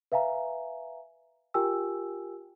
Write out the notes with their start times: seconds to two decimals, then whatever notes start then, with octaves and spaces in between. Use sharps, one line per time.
0.12 B4 E5 F5 G#5 A#5
1.54 F4 G4 A#4 G5 G#5 E6